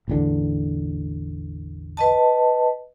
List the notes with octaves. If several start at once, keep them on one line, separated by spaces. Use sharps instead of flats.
A1 E2 D3
B4 D#5 A5